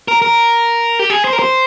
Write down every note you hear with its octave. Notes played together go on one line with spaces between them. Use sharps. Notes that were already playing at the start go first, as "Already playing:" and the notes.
A#4
A#4
G4
G#4
C5
A#4
C5